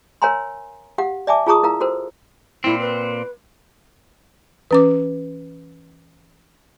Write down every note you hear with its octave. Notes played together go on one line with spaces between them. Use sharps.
A#4 C#5 F5 G#5 A#5 C6
G4 F5 F#5
D5 E5 G#5 A5 D6
F4 G#4 A5 A#5 C#6 D#6
E4 A#4 F5 A#5
F#4 A4 A#4 C5
A#2 C4 E4
B4
E3 C#4 B4 D6